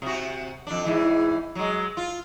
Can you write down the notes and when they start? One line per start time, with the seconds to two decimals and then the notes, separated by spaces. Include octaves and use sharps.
0.02 C3 F#4
0.67 F2 D4
0.85 E2 G#2 E3
1.55 F#3 G#3
1.97 F4